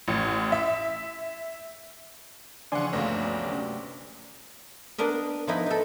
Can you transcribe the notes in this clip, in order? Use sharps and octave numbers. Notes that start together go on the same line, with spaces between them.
A1
E5
C#3 E3 F3 D4 D5 F#5 G#5 C6
G1 D2 A3 A#3 C#4 D4 D5
F#2 C3
B3 D4 A#4 D#5
F3 B3 D#4 E4
D#4 A4